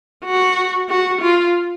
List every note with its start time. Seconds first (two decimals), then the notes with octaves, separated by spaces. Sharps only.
0.25 F#4
0.89 F#4
1.21 F4